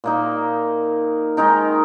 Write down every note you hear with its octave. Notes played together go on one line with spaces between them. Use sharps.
A#2 A#3 D#4
D#3 G#3 D#4 A#4